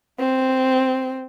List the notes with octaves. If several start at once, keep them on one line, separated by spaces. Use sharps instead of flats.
C4